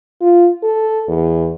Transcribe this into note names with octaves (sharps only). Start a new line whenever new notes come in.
F4
A4
E2